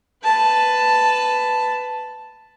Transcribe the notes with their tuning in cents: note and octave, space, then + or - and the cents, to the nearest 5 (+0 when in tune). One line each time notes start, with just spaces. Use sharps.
B4 +15 A5 +0